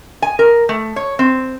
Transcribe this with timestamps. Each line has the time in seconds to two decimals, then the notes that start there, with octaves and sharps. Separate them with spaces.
0.22 G#5
0.39 A#4
0.69 A3
0.96 C#5
1.19 C4